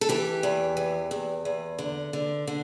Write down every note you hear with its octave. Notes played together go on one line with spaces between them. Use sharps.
A4
E3 G4
E2
E2
E2
E2
D3
D3
D3